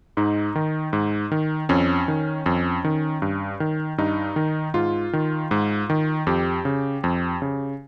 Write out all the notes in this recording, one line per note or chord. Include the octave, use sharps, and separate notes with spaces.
G#2 D#4
D#3
G#2
D#3
F2 C#4
D#3
F2
D#3
G2
D#3
G2 D#4
D#3
G#2 F4
D#3
G#2
D#3
F2 G4
C#3
F2
C#3